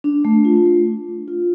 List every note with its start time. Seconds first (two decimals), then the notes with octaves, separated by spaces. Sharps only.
0.04 D4
0.25 A3
0.45 F4
0.66 A3
0.87 D4
1.08 A3
1.28 F4